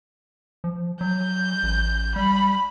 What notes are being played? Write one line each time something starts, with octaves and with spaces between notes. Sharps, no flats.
F3
F#3 G6
A1
G3 B5